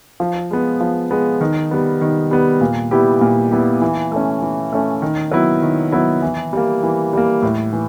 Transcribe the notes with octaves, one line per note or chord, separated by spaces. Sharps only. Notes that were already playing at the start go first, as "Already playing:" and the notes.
F3
G#3 B3
F3
G#3 B3
D#3
G3 B3
D#3
G3 B3
A#2
G3 B3 E4 G4
A#2
G3 B3 E4 G4
E3
A3 C#4
E3
A3 C#4
D#3
F#3 B3 E4
D#3
F#3 B3 E4
E3
G3 A#3
E3
G3 A#3
A2
E3